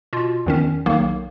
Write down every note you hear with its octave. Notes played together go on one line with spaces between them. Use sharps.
B2 F4
E2 D#3 C#4
B1 D#3 A#3